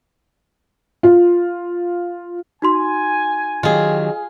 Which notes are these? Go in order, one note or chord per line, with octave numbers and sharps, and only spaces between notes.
F4
D#4 F#4 G#5 C6
D#3 F#3 F4 G4 G#4